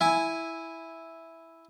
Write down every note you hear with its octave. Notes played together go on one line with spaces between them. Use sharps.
E4 G#5